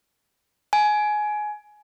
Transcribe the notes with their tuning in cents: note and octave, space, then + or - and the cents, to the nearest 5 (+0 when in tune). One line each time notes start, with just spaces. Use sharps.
G#5 +20